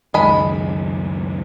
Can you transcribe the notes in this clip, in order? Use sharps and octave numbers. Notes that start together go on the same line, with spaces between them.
C#2 F#2 D#3 G#3 B5